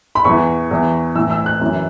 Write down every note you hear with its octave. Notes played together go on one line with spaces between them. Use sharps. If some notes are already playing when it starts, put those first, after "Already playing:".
B5
E2 E3 C#6
E2 E3
A2 E3 E6
E6
F#6
F#2 E3